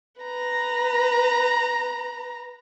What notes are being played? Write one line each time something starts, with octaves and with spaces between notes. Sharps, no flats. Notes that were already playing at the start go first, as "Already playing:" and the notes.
B4 A#5